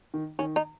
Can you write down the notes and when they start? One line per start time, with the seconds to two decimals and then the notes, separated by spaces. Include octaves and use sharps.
0.14 D#3
0.39 D#3 C#4
0.56 D#4